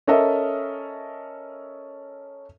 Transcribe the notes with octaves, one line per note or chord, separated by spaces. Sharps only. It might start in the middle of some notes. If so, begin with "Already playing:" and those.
C#4 A4 A#4 D#5 E5